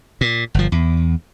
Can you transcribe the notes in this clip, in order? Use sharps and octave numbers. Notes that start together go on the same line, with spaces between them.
A#2
G1 F3
E2